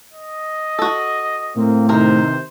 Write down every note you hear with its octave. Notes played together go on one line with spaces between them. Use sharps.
D#5
F#4 A4
A2 A#3 C4
C3 D#3 E3 D#4 A#4 C5 A#5